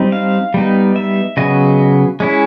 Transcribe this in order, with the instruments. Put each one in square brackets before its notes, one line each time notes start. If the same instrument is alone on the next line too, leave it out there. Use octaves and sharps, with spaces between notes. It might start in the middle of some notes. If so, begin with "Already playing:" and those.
Already playing: [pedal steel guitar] G3 C4 D#4
F5
G3 B3 D#4
E5
C#3 F#3 B3 D#5
G#3 C#4 E4